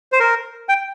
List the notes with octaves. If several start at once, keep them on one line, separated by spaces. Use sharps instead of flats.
C5
A#4
G5